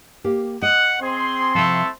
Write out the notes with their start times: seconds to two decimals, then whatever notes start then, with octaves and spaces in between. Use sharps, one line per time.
0.24 A#3 G4
0.62 D#5 F#5
1.01 C4 G#4 C6
1.55 C3 F3 A3 E4 A4